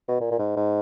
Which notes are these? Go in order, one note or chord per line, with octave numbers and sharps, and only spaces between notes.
B2
A#2
A#2
G#2
G#2